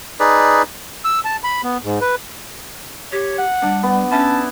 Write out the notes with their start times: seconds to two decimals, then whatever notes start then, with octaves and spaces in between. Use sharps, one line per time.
0.20 D#4 G#4 B4 D5
1.05 E6
1.25 A5
1.44 B5
1.63 B3
1.84 G#2
2.01 B4
3.12 G4 C#5
3.38 F#5
3.62 G3 D4
3.83 B3
4.11 C#4 E4 A5